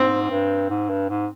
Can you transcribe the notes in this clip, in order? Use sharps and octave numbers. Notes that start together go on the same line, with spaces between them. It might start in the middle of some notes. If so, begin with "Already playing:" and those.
Already playing: G#2 C4
G2
G#2
G2
G#2